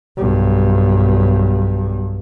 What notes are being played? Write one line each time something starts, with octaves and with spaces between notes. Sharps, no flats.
B1 G2